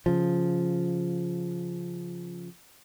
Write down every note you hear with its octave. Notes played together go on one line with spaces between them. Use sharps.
C#3 F3